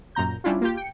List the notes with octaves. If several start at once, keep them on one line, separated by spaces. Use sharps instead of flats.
F#2 A#2 A#5 G6
G3 C#4 D4 E4 F4
A#3 F4 G4
G5 C#7